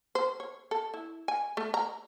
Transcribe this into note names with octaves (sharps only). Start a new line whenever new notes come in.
C5
C#5
A4
E4
G#5
A3
A#5